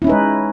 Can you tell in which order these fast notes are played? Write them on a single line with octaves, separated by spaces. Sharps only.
E4 C#4 D#4 B4 G#3